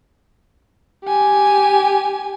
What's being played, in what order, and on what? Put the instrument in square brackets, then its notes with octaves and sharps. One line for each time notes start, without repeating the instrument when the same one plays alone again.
[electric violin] G4 G#5